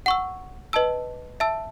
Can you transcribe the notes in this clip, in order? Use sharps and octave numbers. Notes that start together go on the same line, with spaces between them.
F#5 C#6 E6
B4 D#5 A5 E6
E5 A5 E6